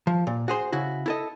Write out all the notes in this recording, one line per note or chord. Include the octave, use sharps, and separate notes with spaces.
F3
A#2
F#4 G#4 C5
C#3 E4 F#4
E4 A4 D#5